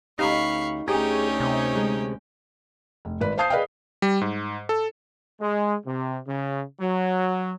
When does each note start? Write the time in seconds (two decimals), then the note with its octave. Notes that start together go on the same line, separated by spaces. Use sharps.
0.19 D2 C#4 D#4 G4 F5 B5 C#6
0.88 D2 C#4 D#4 G4 G#4 C#5 G5
1.40 C3
1.72 D3 G#3
3.05 F1
3.21 G#1 B4 D5
3.38 C5 F5 A5 D#6 G6 C7
3.50 G#4 B4 D5 D#5 F5 G5
4.02 G3
4.21 G#2
4.69 A4
5.41 G#3
5.85 C3
6.27 C#3
6.81 F#3